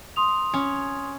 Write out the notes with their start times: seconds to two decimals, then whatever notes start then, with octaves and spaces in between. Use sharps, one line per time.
0.16 C6 D#6 F7
0.53 C#4